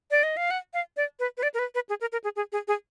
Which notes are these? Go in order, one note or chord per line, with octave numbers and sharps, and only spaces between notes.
D5
D#5
F5
F#5
F5
D5
B4
B4
D5
A#4
B4
B4
G#4
A#4
A#4
G#4
G#4
G#4
G#4